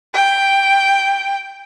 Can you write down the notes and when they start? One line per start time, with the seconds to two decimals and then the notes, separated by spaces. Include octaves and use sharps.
0.14 G5